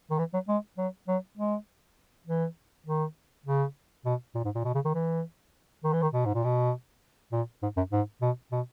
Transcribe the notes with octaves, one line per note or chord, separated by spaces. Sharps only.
D#3
E3
F#3
G#3
F#3
F#3
G#3
E3
D#3
C#3
B2
A#2
G#2
A#2
B2
C#3
D#3
E3
D#3
E3
D#3
B2
G#2
A#2
B2
A#2
G#2
F#2
G#2
B2
B2